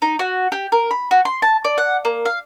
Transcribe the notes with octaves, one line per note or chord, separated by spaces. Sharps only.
D#4
F#4
G4
A#4
B5
F#4
C6
A5
D5
F#5
A#3
F5